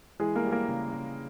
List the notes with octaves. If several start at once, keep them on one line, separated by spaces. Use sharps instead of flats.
E3 G#3 G#4
A#3 A#4
G3
A#3 A#4
C#3
C#3